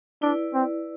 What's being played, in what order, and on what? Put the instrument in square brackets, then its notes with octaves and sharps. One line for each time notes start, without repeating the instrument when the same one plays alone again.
[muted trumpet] D4 [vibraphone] E4 B4 D5
[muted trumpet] C4